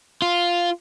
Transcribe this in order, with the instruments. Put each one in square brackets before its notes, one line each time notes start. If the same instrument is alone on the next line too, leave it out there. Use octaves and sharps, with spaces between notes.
[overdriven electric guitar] F4